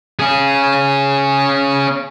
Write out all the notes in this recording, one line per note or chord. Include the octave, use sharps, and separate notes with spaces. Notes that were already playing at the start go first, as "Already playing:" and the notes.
C#4 G#4